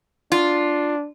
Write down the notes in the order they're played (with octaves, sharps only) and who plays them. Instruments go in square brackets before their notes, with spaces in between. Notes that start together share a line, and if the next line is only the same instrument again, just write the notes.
[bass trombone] D4 [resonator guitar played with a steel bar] F4